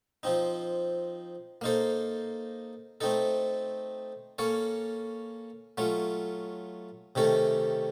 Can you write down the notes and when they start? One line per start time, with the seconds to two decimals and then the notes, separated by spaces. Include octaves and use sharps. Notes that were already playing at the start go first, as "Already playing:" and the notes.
0.23 F3 C4 D#4
1.61 A#3 D#4 A4 C5
3.01 A3 C4 D#4 A4
4.38 A#3 C#4 A4 C#5
5.77 F#3 A3 C#4 F4
7.15 C3 D#3 A3 C#4 A4